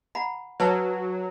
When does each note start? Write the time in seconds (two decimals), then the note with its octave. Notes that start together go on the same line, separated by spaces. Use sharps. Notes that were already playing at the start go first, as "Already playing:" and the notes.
0.15 F#5 A#5 B5
0.60 F#3 B4 A5